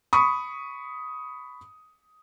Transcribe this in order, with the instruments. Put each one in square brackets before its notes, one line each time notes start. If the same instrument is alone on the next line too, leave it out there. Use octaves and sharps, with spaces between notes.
[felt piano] B5 C#6 D#6